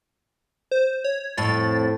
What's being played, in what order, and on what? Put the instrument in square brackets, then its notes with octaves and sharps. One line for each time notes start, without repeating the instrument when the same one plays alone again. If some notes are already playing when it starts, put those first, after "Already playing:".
[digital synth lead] C5
C#5
[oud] F2 A2 [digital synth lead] A6